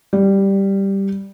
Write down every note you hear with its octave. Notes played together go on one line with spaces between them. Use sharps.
G3